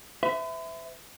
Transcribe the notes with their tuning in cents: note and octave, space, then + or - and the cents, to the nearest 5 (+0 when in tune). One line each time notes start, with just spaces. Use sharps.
B4 +45 E5 +0